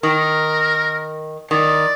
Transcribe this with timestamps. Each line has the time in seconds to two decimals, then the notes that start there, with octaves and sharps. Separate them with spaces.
0.03 D#3 A#4
1.51 D#3 D5